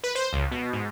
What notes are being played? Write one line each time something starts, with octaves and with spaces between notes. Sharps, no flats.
B4
C5
C#2
B2
G#2